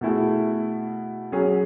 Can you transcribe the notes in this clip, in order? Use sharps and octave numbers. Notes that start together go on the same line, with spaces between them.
B2 A3 E4 G#4
F#3 C#4 G#4